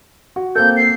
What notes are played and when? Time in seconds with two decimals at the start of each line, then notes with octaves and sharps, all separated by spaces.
0.36 F#4
0.56 A#3 C4 A4 G6
0.77 C7